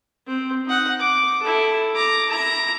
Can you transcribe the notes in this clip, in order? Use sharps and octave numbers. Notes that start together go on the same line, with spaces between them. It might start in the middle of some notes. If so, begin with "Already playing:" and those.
C4
D#4 F#5
D6
E4 A4
A#5 D6
E4 A#5